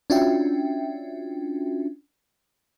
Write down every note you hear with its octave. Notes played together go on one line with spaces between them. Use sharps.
C#4 D4 F4 F#4 E5 G5